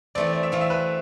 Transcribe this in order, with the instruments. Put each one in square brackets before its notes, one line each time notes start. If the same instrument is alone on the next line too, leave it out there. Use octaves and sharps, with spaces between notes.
[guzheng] E3 A3 C4 [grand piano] D5
[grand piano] D5
E5
[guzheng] E3 A3 C4 [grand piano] F5
[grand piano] E5
B4